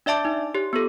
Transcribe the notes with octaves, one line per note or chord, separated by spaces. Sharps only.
D4 D5 E5 A5 D6
D#4
G4 C#5
B3 F4 A4